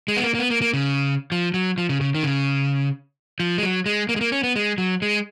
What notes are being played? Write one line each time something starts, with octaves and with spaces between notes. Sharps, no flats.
G#3
B3
A#3
A#3
B3
A#3
A#3
C#3
F3
F#3
F3
C#3
C#3
D#3
C#3
F3
G#3
F#3
G#3
A#3
G#3
A#3
C#4
B3
G#3
F#3
G#3